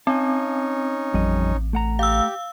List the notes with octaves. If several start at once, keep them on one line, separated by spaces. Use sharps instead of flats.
C4 C#4 D#4 G#5 A5
A1 F2 G3 D#5
A3 F#5 A#5
G4 F5 E6